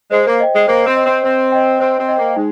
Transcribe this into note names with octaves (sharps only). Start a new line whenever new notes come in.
G#3 C5
A#3
D#5 G5
G#3
A#3 C5
C4
D#5 G5
C4
C4 C5
D#5 G5
C4 C5
C4
D#5 G5
A#3
G#3 D#4